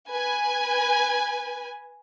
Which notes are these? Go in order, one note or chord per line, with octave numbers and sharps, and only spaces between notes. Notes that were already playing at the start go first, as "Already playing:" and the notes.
B4 G#5